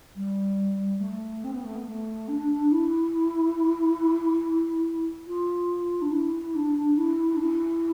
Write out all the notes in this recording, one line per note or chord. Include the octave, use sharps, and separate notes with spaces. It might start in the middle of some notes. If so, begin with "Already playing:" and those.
G3
A3
C4
B3
A3
B3
A3
D4
E4
F4
D4
E4
D4
E4
D4
E4